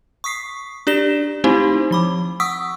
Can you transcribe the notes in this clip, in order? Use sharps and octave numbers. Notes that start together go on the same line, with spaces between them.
C#6 D#6 B6 C7
D4 G4 D5 E7 G7
A3 C4 D#4 E4 G4 C5
F3 B5 D6
F#5 C#6 D#6 E6 B6